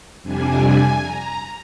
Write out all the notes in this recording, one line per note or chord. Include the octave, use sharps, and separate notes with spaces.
F2 C3 G3 D4 G#5
A#5